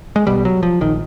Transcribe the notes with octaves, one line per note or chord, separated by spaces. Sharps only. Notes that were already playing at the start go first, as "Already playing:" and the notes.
G#3
B1 B2 G3
F#3
F3
A#1 D#3